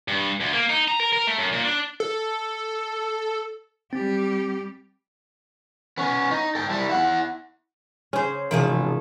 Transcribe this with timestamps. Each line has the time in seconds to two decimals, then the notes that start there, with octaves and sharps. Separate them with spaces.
0.08 G2
0.40 D2
0.53 A#3
0.69 D#4
0.88 A#5
1.00 A#4
1.12 A#4
1.27 A3
1.38 F#2
1.53 A#2
1.64 D4
2.00 A4
3.93 G3 C4 G4
5.98 B3 C#4
6.31 D#4
6.55 A4 G5
6.70 G3 E4
6.89 E4 F#5
8.13 C#3 C#4 G#4 C5
8.51 G#1 C3 E3 F3 A3 G#4 A#4